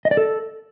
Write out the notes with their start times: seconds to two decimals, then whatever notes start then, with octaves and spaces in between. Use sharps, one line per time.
0.05 D#5
0.11 D5
0.17 A4